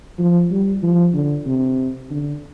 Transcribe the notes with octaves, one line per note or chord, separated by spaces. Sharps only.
F3
G3
F3
D3
C3
D3